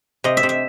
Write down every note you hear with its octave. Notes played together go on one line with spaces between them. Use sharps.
C3 D#5
E5
C3
E5